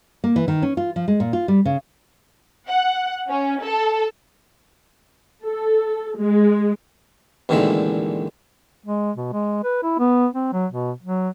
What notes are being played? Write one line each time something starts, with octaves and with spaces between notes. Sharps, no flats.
A#3
E3
D#3
C#4
F4
F3
G#3
A#2
F4
G3
C#3
F#5
C#4
A4
A4
G#3
A1 A#2 D3 D#3 G#3 E5
G#3
B2
G#3
B4
E4
B3
C4
F#3
B2
F#3